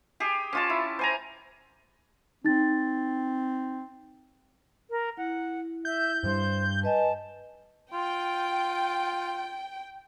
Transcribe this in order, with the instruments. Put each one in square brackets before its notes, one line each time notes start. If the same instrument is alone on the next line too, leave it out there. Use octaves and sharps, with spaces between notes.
[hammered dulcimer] G4 G#4
C#4 F4 A5
E4
C5 G#5 A#5
[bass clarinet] C4 [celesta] D#4 A6
[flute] A#4
[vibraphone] E4 [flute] F#5
[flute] E5 [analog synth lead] G6
[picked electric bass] G2 G3 [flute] C5
[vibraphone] B4 D#5 G#5 [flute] A5
[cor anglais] F4 [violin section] G5